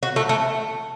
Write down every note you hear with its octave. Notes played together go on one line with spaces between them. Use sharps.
F#4
A3
A3